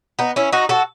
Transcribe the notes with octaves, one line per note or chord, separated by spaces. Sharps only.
B3 D#4
C#4 E4
D#4 F#4
F#4 A4